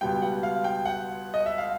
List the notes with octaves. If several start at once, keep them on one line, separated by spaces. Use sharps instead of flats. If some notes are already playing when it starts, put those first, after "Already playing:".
C#2 B2 G3 G5
F#5
F5
G5
F#5
D#5
E5
F5